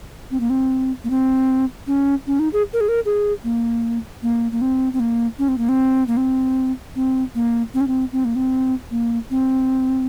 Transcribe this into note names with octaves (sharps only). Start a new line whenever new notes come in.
C4
A#3
C4
A#3
C4
C#4
C#4
D#4
G#4
A#4
G#4
A#4
G#4
A#3
A#3
A#3
C4
C4
A#3
C#4
C4
A#3
C4
A#3
C4
C4
A#3
C4
C#4
C4
C4
A#3
C4
A#3
C4